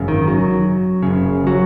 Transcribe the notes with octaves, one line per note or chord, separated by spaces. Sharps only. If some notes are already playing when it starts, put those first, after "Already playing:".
Already playing: G#1 F#2 C#3
D#3
F#3
F#1 F#2 C#3
F#3